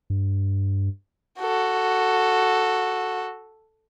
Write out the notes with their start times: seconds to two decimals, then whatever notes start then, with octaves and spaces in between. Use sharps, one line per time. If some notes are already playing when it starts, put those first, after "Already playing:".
0.10 G2
1.40 F#4 A4